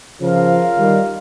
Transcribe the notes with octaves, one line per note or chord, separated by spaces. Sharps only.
C#3 F3 F4 A#4 F5
D#3 G3